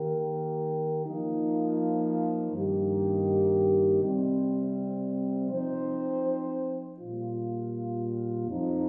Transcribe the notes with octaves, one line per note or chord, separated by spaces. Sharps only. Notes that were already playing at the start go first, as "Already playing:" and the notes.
Already playing: D#3 A#3 G4 A#4
F3 A#3 D#4
G2 D#3 A#3 D#4 G4
C3 G3 C4
F3 C4 D#4 C5
A#2 G3 A#3 F4
F2 F3 D#4